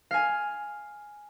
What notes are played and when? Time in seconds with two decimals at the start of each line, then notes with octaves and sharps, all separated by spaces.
0.11 F5 G#5